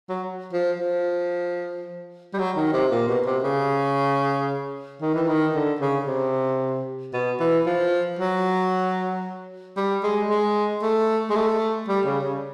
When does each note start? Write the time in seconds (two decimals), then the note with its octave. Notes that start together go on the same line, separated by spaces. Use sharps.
0.10 F#3
0.53 F3
0.80 F3
2.34 G3
2.39 F#3
2.56 D#3
2.73 C3
2.91 A#2
3.08 B2
3.26 C3
3.43 C#3
5.02 D#3
5.15 E3
5.28 D#3
5.55 D3
5.81 C#3
6.07 C3
7.13 B2
7.40 E3
7.66 F3
8.19 F#3
9.77 G3
10.04 G#3
10.30 G#3
10.82 A3
11.30 G#3
11.36 A3
11.88 G3
12.06 C#3
12.23 C#3